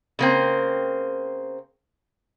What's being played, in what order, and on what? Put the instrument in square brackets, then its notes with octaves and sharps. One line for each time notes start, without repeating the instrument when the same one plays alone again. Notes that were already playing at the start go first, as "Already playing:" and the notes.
[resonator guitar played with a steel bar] C#3 A#3 C4